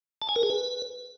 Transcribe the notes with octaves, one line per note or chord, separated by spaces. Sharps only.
A5
G#5
A#4
G#4
B4